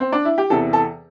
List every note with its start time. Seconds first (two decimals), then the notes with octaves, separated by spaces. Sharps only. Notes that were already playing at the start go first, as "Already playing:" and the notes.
0.00 C4
0.12 D4
0.25 E4
0.38 G4
0.50 E2 C3 E3 A4
0.73 A4